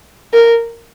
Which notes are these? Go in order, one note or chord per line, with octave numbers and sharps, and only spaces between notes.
A#4